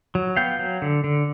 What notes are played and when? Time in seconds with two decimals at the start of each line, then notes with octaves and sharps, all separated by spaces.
0.15 F#3
0.36 B3 F5 G5
0.59 F#3
0.82 D3
1.04 D3